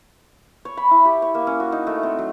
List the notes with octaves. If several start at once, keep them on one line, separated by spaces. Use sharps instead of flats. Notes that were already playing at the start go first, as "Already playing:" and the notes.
C#5
B5
E4
G4
C#5
A#3
C#4
F#4
D#4
A3
C4
F#3